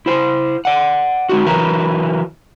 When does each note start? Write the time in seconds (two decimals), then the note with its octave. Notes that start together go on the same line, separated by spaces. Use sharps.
0.06 E4 C5
0.65 D5 F#5
1.29 G#3 D#4 F#4
1.46 E3 F#3 E4 A#4 B4